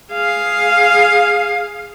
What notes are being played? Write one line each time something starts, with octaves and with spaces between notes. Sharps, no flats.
G#4 F5